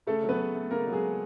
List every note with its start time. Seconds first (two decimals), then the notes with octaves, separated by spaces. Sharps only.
0.07 C#3 A3 A4
0.23 F#3
0.29 B3 B4
0.39 C#3
0.55 A3
0.71 C#3 A#3 A#4
0.87 F#3
0.92 G#3 G#4
1.02 C#3